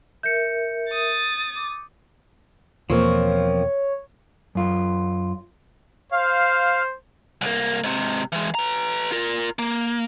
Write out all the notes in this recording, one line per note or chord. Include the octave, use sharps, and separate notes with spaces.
A#4 E5 G6 C#7
D#6 A6
D6
E2 B2 F3 A#3 C4 F4 C#5
F#2 F4
C5 F5
C2 A#3
G#2 C3
E3 G#3
B4 A#5
F4 A#4
A#3